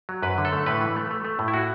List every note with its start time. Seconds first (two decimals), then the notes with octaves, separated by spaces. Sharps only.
0.09 F#3
0.23 F#2 B4
0.38 D3
0.45 A4
0.52 A3
0.66 A2 B4
0.81 E3
0.96 A3
1.11 A3
1.25 A3
1.39 A2
1.48 E4
1.54 F#4